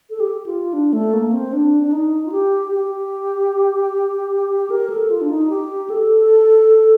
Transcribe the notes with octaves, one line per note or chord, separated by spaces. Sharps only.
A4
G4
F4
D4
A3
A#3
C4
D4
D4
D#4
F4
G4
G4
A#4
A4
F4
D4
D#4
G4
A4